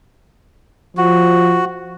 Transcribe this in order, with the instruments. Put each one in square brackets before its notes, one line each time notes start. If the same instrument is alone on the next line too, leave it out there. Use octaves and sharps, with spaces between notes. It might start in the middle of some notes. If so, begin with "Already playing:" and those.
[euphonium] F3 [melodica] F#4